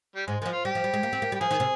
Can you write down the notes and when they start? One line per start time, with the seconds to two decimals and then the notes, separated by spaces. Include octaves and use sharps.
0.16 G3
0.27 G#2 G#3
0.40 D#3 G#3
0.46 F3
0.52 F4
0.65 G3 G4
0.75 F3
0.84 G3
0.94 G#3
1.03 A#3
1.13 C4
1.22 A#3
1.32 G3
1.35 G4
1.41 F3 G#4
1.51 D#3
1.60 C3